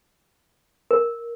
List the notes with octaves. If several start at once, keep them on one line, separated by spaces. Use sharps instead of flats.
A#4